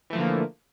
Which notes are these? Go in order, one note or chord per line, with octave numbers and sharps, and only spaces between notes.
D3 E3 F3 A3 A#3